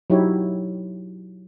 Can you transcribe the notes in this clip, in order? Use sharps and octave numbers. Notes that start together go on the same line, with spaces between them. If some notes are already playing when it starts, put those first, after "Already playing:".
F#3 D#4 E4 G4 C#5